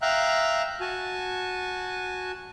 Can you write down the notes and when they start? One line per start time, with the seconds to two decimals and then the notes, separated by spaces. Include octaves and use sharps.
0.02 E5 F5 G5 A#5 F#6
0.81 F#4 G#5 A5